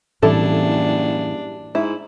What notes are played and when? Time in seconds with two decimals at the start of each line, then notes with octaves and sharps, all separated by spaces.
0.23 F#1 A2 E3 G3 C4 D4 E4 A4
1.75 G#2 E4